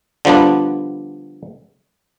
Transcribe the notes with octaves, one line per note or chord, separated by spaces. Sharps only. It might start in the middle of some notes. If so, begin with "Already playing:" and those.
D3 F3 G3 B3 D4